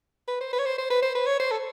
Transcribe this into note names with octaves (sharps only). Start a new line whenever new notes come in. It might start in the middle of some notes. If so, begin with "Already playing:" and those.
B4
C5
B4
C#5
C5
C5
B4
C5
B4
C#5
C5
A4